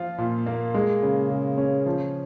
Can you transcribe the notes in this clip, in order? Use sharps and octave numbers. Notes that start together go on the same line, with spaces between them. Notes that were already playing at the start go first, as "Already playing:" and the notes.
Already playing: F3 F4
A#2
A#3
G#3
C#3
C#3
C#4
F3